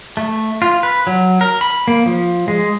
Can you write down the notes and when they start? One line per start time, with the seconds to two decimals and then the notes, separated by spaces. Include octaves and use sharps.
0.17 A3
0.62 F4
0.83 B4
1.07 F#3
1.41 A#4
1.61 B5
1.88 A#3
2.06 F3
2.48 G#3